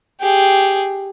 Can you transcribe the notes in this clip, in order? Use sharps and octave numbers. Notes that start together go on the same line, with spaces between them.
G4 G#4